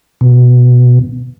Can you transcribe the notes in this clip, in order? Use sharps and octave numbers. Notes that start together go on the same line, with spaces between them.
B2